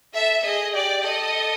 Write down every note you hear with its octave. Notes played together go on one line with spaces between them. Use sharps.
A4 E5
G#4 D#5
G4 D5
A4 D#5